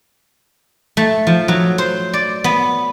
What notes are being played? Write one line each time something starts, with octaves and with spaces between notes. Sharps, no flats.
A3
F3
F#3
C5
D5
B3